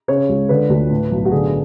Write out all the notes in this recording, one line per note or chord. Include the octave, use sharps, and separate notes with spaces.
C#3 C#5
C#2
D3 B4
D2
A2
B1
F#4
D3 G#4